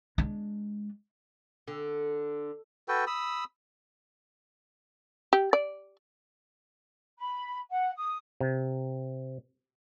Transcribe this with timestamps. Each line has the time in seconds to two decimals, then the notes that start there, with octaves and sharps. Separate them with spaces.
0.18 G#3 D4
1.68 D3
2.88 F#4 A4 B4 G5
3.07 B5 D#6 E6
5.33 G4
5.53 D5
7.19 B5
7.71 F#5
7.97 D#6
8.41 C3